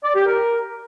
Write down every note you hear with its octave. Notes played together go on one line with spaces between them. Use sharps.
D5
G4
A#4